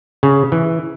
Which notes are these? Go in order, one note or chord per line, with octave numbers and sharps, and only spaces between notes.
C#3
E3